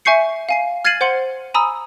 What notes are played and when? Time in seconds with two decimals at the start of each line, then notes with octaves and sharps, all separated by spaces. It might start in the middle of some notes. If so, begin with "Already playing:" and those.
0.05 E5 G#5 C#6 G6 C7 C#7
0.49 F5 G#5 C7
0.85 F6 G#6 A6 C7 D#7 F#7
1.01 C5 F#5 C6 C#7 F#7
1.54 G#5 A#5 B5 D#6 E6